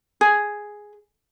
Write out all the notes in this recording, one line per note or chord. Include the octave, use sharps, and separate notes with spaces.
G#4